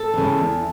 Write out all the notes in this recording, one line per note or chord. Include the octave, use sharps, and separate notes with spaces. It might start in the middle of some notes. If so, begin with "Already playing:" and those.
Already playing: A4
C#3 E3
E2